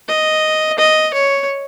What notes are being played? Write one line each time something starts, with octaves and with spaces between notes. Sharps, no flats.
D#5
D#5
C#5